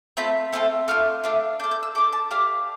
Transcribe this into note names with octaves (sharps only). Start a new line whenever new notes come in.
A3 C4 F4 A4 B5
A3 C4 F4 A4
A3 D4 F4 F6
A3 D4 F4
D4 A4 G6
G6
E6
D4 A4 D6
A5
D4 G4 F5